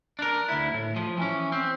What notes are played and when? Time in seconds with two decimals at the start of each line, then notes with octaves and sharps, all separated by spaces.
0.19 D4 A#4
0.48 D2 E4
0.74 A2
0.96 F3
1.17 E3 C#4
1.52 C4